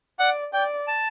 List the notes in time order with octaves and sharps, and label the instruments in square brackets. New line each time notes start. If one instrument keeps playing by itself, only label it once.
[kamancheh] D5 [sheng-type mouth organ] F#5
[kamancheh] D5 [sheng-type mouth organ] G5
[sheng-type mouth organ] A5